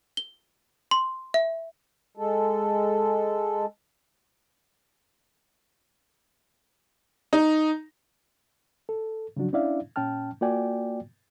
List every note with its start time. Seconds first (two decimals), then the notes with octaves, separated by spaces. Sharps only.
0.17 G7
0.91 C6
1.34 E5
2.17 G#3 A4
7.33 D#4
8.89 A4
9.37 C#3 F3 F#3 D4 F#4
9.53 C#4 D4 E4 D5 E5 F5
9.96 A#2 C#4 G5 A5 F6
10.41 A#3 F4 F#4 D5 G5 G#5